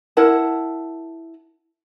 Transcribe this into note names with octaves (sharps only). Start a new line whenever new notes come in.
E4 A#4 F#5 A5